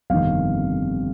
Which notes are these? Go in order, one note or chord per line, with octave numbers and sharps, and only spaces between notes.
G1 F2 C3 D#3 F5